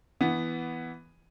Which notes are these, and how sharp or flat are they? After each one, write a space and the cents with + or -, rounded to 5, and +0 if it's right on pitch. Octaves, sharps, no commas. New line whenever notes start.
E3 +0 B3 +0